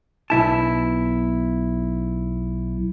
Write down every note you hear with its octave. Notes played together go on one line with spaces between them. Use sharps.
B1 E4 A5